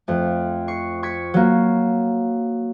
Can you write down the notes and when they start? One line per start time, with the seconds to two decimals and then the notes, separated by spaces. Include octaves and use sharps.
0.08 F2 A3
0.68 C#6 C7
1.03 C#6 G#6 B6 C#7
1.34 F#3 A#3